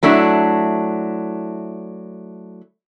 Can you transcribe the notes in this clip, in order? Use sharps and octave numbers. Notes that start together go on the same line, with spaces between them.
F#3 A3 D4 E4